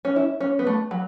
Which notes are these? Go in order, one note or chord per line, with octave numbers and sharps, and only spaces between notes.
C#4
E4
C#4
B3
A3
F#3